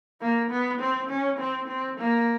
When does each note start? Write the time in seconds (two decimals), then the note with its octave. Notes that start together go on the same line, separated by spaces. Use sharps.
0.21 A#3
0.51 B3
0.80 C4
1.09 C#4
1.39 C4
1.68 C4
1.97 A#3